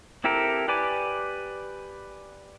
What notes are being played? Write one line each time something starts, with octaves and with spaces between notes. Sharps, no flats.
C4 E4 G4 A4 A#4
G4 B4 D5 G#5 D6